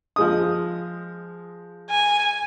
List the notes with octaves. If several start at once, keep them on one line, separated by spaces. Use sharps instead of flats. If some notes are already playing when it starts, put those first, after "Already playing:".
F3 G#3 D#6
G#5